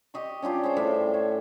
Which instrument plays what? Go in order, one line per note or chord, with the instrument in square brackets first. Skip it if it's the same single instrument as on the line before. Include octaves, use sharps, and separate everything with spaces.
[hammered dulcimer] G4 D#5 C#6
C#4 D4 F4 G4
G#4 C5 C#5 G5
A2 D4 E5
C#5